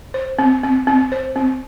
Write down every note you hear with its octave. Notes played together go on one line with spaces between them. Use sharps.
C5
C4
C4
C4
C5
C4